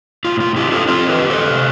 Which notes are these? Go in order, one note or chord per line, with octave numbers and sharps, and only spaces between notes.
A2 F4
F4
D4 E4 G4
F4 A4
C4 F4 A4
G4 B4
D3
A4 C5
C3